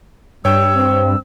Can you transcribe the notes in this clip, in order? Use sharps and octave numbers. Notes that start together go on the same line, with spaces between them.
G2 G3 C#5 G5 E6
C4